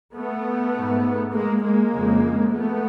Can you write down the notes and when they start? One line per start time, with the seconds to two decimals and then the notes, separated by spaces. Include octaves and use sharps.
0.15 A3 B3
0.74 G#2
1.33 G#3 A#3
1.64 G#3 A#3
1.93 F2 C#3
2.52 A3 B3